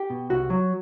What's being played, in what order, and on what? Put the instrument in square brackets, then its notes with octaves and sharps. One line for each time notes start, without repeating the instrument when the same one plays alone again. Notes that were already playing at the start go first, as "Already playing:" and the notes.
Already playing: [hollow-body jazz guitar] G4
B2
C2 F#4
F#3